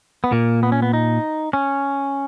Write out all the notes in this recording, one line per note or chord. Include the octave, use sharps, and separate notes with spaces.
B3
A#2 A#3
B3
C#4
B3
D#4
C#4